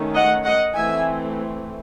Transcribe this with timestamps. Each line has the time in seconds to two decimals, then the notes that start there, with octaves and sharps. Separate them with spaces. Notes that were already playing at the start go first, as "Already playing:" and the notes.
Already playing: D#3 A3 C#4
0.15 D#5 F#5
0.44 D#5 F#5
0.74 E3 A3 C4 E5 G#5